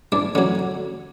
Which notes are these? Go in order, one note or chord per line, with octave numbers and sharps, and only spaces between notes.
G2 D4
D3 F#3 C#4